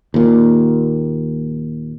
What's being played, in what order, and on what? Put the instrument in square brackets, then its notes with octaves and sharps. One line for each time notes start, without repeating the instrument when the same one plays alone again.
[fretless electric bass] D#2 A#2